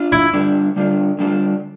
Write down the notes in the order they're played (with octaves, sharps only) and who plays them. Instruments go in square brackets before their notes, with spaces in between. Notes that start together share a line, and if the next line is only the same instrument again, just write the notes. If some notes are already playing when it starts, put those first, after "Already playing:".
Already playing: [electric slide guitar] D4 F4
[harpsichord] E4
[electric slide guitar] D3 G3 D4 F4
D3 G3 D4 F4
D3 G3 D4 F4